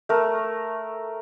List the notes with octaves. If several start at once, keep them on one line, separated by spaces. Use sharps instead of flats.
A3 A#4